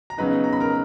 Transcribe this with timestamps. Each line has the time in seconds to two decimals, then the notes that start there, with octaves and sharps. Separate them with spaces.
0.10 A#5
0.18 C#3 F#3 B3 D#4 B4 B5
0.44 A#5
0.53 B5
0.60 A#4 A#5